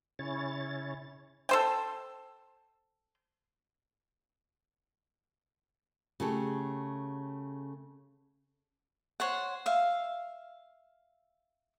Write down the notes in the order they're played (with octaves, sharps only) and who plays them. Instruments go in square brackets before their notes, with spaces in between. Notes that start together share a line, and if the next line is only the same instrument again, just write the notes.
[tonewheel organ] C#3 C#4 E4 C#5 A6
[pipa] A4 C5 G5
[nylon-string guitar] C#3 A3 G4 A4
[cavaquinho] C5 C#5 F#5
E5 F5